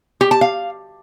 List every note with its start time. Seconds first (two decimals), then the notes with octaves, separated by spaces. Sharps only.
0.21 G4
0.31 A5
0.41 F5